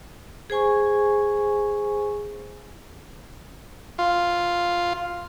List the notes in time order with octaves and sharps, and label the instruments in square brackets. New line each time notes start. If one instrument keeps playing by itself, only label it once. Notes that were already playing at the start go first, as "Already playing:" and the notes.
[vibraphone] G#4 C5 G#5 C#6
[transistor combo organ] F4